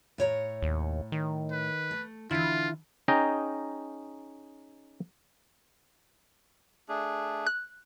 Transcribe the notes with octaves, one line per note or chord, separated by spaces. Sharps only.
A2 C#5 A#5
D#2
D#3
B4
A3
D3 E3 E4 F4
C#4 D#4 G#4 D#5 G5 A#5
A3 D4 G#4
F#6